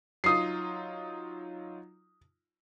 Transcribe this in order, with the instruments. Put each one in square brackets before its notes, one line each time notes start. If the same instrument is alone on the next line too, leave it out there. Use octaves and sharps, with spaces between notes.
[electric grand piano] F#3 D#4 F4 [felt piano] D#6 C7